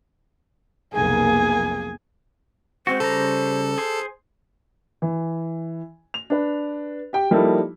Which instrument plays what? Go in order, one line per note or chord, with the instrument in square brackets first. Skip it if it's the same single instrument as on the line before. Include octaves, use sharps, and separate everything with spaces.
[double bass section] F1 B1 A#3 [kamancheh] G#4 G#5
[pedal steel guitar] G#3 C4 F#4 [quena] C5
[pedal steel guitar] C#3 G3 A#5 [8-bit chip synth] A4
[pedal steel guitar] G#4 C5
[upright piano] E3
F7
D4 B4
G4 G5
F3 G3 A#3 D#4 E4 A4